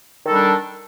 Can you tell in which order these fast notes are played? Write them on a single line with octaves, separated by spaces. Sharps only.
D#3 A4 G3 D4